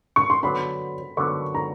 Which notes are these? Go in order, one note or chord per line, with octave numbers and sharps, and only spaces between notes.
C#6
C6
D3 F#3 B3 B5
D3 F#3 B3 C#6
A#5